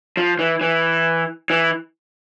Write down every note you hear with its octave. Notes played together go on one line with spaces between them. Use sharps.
F3
E3
E3
E3